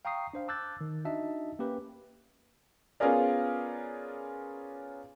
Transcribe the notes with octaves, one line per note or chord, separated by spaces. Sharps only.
F5 G5 A#5 C#6 D#6 C7
D4 C5 F5
A5 D6 E6 F#6 G6 A6
D#3
D4 D#4 F#4 D#5 E5 A5
A#3 C#4 G4 B4
B3 C#4 F4 G#4 A#4 D5